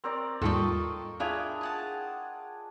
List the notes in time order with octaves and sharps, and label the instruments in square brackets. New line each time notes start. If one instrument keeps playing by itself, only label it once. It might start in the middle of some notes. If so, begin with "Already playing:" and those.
[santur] C4 A#4 D5
[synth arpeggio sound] D#2 G#2 G3 [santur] F4 G5 C#6 [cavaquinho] A4 D#5
[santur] D4 G#4 G5 [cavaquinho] E4 F4 A#5
[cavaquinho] D#5 F#5 A5